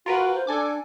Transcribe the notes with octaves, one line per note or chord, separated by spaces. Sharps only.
F4 F#4 A#4 B4
C5
D4 A4 G#5 D6